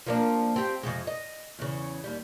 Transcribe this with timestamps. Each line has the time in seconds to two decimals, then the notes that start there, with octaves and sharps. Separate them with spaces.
0.06 F3 A#3 D4
0.56 C4 G4
0.83 F2 C3 G#3
1.07 D#5
1.59 E2 C#3
2.04 D#2 G3